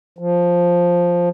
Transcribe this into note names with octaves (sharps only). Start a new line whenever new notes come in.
F3